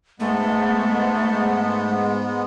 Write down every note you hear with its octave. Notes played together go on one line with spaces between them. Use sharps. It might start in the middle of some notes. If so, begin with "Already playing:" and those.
G#2 G#3 A3 B3